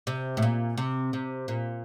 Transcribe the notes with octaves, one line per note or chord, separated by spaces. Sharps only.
C3
A2
A#2
C3
C3
A#2